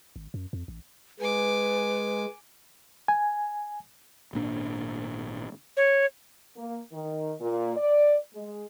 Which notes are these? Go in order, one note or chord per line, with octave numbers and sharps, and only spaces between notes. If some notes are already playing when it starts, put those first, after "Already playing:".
G#1
F#2
F2
A1
G#3 B4 G#5 D6
G#5
G#1 A#2 D4
C#5
A#3
D#3
A#2
D5
G#3